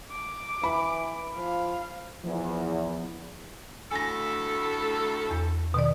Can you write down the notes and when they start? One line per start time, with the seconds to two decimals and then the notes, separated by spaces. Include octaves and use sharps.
0.12 D6
0.64 E3 B5
1.37 F3 F5
2.24 E2 F3 B3
3.92 D2 A2 A4 G#5 A#6
5.31 E2
5.74 B2 D#3 D5